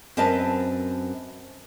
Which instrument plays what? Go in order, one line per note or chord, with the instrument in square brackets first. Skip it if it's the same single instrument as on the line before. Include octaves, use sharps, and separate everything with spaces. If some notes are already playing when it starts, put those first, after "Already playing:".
[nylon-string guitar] F#2 C4 A#4 B4 D#5 A5